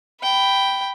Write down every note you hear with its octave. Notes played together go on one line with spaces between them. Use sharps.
G5 B5